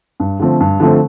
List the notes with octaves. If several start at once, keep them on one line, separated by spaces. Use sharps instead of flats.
G2
D3 F3 A3 C4
G2
D3 F3 A3 C4